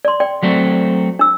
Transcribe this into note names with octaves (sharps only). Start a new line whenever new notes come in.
D5 C6
D5 G5
F#3 A3 C4
D4 E6